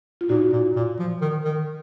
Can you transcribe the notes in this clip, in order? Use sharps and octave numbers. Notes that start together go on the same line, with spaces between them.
F4
A#2 D#4 F#4
A#2
A#2
F3
D#3
D#3